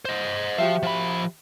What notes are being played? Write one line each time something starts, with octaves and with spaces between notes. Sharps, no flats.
C5 D#5
F3 F#4 G4 E5 F5
F3 B5